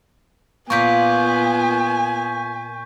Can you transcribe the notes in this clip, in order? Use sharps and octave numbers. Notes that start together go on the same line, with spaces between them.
A#2 A#3 B3 F4 G#5 C#6 G6 B6